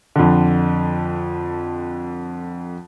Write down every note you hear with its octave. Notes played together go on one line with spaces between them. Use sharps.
F2 D3